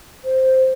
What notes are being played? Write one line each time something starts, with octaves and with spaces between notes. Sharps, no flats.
C5